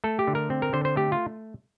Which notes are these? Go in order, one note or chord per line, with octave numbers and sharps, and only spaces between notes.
A3 A4
G4
D3
A#4
C4
A#4
D3 C5
C5
A3 G4
F4